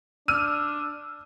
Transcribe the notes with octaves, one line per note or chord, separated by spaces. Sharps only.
D4 E6 F6 D#7